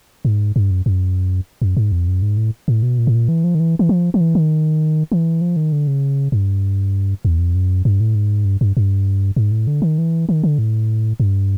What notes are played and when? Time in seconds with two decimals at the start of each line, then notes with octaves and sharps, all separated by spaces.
0.25 G#2
0.56 G2
0.71 F#2
0.86 F#2
1.62 F#2
1.77 G#2
1.92 F2
2.08 F#2
2.22 G#2
2.37 A2
2.68 A2
2.83 B2
2.98 A#2
3.07 A2
3.15 A#2
3.29 E3
3.44 F3
3.55 D#3
3.60 E3
3.79 E3
3.89 F3
4.14 F3
4.21 E3
4.35 D#3
5.12 E3
5.41 F3
5.56 D#3
5.72 D3
5.87 C#3
6.32 G2
7.25 E2
7.39 F2
7.55 F#2
7.85 G2
8.00 A2
8.15 G#2
8.45 G2
8.61 G2
8.77 G2
9.36 G#2
9.51 A2
9.67 D3
9.82 D#3
9.98 E3
10.29 D#3
10.44 D3
10.59 A2
11.20 G2